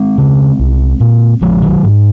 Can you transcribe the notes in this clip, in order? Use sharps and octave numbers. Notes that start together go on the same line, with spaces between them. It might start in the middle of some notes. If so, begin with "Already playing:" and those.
Already playing: G#3 C4
C#3
C2
A#2
A#1 F3 G#3
D#3 F#3
G#2